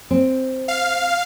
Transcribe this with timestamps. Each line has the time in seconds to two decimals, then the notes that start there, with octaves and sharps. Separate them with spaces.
0.11 C4
0.68 F5